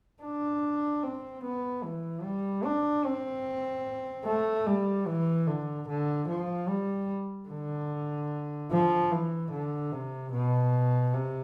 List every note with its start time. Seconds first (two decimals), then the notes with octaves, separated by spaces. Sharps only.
0.22 D4
1.03 C4
1.43 B3
1.83 E3
2.24 G3
2.64 D4
3.05 C4
4.26 A3
4.66 G3
5.07 E3
5.47 D3
5.88 D3
6.28 F3
6.68 G3
7.49 D3
8.71 F3
9.11 E3
9.51 D3
9.92 C3
10.32 B2
11.13 C3